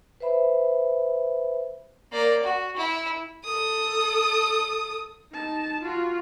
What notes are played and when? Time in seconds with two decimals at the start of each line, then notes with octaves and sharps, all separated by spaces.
0.20 B4 C5 E5 B5
2.11 A#3 D5
2.43 F#4
2.76 E4
3.44 A4 D#6
5.32 D#4 A5
5.81 F4 F#4